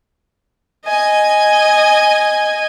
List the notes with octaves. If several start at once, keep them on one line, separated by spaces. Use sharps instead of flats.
D#5 G#5